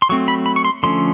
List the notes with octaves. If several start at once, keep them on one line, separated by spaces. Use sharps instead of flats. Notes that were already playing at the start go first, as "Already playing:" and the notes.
C6
F#3 A3 C4 C#6
B5
B5
C#6
C6
D3 F3 A3 C#4 C6